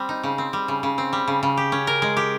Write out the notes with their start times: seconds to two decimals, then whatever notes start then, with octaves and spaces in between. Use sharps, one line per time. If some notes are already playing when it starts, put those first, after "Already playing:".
Already playing: G3 C4
0.09 D#4
0.23 C#3
0.38 C4
0.53 G3
0.68 C#3
0.83 C#3
0.98 C4
1.13 G3
1.28 C#3
1.43 C#3
1.57 G4
1.72 C#4
1.87 A#4
2.02 G#3
2.17 G4